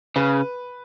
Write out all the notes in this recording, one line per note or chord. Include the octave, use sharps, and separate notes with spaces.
C#3 B4